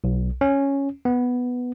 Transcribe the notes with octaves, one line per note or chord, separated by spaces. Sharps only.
B1
C#4
B3